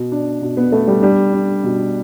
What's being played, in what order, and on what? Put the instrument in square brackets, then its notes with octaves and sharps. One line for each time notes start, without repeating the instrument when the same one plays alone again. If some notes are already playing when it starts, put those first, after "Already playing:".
Already playing: [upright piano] B2
D4
B2
[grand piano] B3
[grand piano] A3 [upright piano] B3
[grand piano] G3
[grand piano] G3 [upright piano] D4
[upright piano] D4
B2